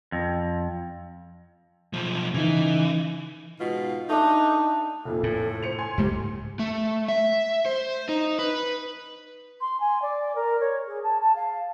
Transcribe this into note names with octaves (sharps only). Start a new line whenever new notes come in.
F2
B1 F3
C#3 E3 D#4
G#2 B2 F4
A3 D4 D#4
F1 F2 A#2 A4
A2
C5 C#7 F7
G#5 C6 G#6
C#2 G#2 A3 G4
A3
E5
C5
D#4
B4
C6
G#5
D5
A#4
C#5
G#4
A5
A5
F5